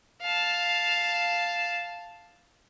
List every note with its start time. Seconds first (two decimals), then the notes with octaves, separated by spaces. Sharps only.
0.22 F5 A5